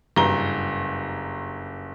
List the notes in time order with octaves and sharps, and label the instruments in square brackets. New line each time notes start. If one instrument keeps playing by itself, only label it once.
[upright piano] F#1 A#5 G7 [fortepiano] G2